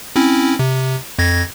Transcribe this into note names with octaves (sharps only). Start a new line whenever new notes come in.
C4 C#4 E4
C3
F2 G#6 A#6